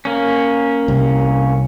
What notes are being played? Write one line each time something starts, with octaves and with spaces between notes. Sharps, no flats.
A#3 C#4
C2